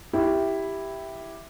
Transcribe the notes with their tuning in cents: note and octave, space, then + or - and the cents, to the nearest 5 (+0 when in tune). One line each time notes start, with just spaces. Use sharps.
E4 +0 G4 +0